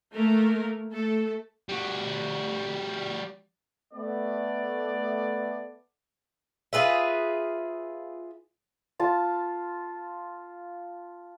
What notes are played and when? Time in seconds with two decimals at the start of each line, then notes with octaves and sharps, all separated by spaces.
0.14 A3 A#3 A#4
0.92 A3 A4
1.69 G3 F#4
3.93 A3 B3 D5
6.73 F4 G#4 B4 E5
8.99 F4 A5